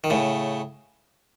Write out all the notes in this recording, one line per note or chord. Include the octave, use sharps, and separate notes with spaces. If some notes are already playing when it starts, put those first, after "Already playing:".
D#3
A2 C#3